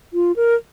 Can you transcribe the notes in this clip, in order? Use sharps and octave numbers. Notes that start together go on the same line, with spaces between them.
F4
A#4